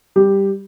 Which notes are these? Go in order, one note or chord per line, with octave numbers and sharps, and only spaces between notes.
G3 G4